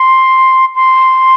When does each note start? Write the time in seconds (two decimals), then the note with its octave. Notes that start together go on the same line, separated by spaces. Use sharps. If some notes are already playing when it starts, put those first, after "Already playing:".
Already playing: C6
0.75 C6